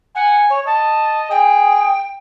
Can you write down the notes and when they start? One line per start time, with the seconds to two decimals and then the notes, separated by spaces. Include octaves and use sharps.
0.15 F#5 G#5
0.50 C#5
0.66 D#5 A5
1.31 G#4 G5